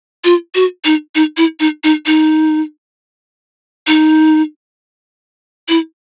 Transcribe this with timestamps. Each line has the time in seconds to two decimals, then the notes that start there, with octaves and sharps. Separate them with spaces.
0.24 F4
0.55 F#4
0.85 D#4
1.15 D#4
1.37 E4
1.60 D#4
1.84 D#4
2.06 D#4
3.87 D#4
5.69 E4